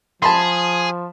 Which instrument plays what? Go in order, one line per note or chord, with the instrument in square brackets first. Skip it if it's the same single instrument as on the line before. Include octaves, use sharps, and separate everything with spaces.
[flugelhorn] F3 [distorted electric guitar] G#4 [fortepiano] A5 B5 C6